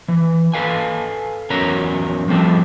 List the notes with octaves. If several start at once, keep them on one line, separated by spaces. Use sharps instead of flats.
E3
A4 B4 F5 G#5
E2 F#3 C#4 A#4 A#5
F3 G3 C4 A4